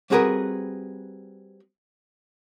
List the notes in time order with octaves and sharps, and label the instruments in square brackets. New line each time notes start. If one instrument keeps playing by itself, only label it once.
[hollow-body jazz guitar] G3 C4 F#4 G#4 A#4 B4